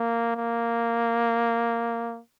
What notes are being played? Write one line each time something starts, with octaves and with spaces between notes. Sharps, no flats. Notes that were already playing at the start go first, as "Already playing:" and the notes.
Already playing: A#3
A#3